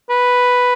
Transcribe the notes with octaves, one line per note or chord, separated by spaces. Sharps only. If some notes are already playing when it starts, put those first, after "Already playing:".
B4